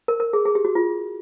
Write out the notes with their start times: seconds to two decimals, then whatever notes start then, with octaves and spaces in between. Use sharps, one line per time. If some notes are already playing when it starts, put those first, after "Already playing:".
0.08 A#4
0.20 A#4
0.33 G#4
0.45 G#4
0.55 G4
0.65 F#4
0.75 F4